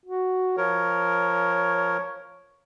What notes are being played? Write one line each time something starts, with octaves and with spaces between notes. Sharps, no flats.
F#4
F3 A#4 C#5